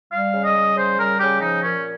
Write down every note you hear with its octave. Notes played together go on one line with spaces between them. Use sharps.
G3 F5
C#3
D#5
G3
C#3 C5
G3 A#4
C#3 G4
F3 D#4
A#2 C#4